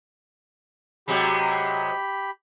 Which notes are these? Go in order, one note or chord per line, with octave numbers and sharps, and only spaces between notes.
C3 F#3 G#3 G4 B5